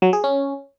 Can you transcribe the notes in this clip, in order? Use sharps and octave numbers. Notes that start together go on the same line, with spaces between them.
F#3
G#4
C#4